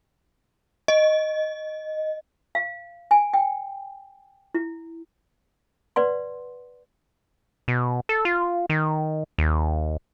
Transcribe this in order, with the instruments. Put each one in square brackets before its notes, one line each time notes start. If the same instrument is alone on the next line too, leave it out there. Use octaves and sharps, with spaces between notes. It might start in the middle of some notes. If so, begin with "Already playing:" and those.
[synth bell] D#5
[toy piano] F5
G#5
G5
E4
B4 D5 F#5 C6
[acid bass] B2
A4
F4
D#3
D#2